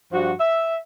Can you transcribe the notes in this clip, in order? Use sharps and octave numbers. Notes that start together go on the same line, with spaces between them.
G2 F3 F#4
E5